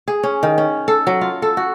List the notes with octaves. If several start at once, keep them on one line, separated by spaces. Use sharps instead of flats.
G#4
C#4
D#3
C#4
A4
F#3
F4
A4
F#4